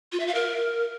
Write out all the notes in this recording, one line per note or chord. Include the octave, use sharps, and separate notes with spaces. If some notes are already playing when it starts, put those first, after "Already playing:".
F4
E5
F5
A#4